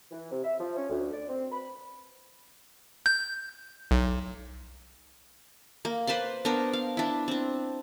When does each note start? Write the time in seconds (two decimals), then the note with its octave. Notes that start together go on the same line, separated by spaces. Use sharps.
0.11 E3
0.31 C3
0.44 E5
0.60 F3
0.77 C#4
0.90 D2
1.13 D5
1.29 C4
1.52 B5
3.06 G6
3.91 B1
5.85 A#3
6.07 B4 C5 D5 C6
6.45 B3 D4 A#4 C5
6.73 F5
6.97 D4 E4
7.28 C4 D4